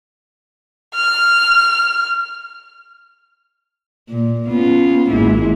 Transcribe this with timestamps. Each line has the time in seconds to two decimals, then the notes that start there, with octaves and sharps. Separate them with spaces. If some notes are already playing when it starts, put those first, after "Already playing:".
0.95 F6
4.09 A#2
4.49 B3 C#4 F4
5.10 G#1 G#3 A#3 E4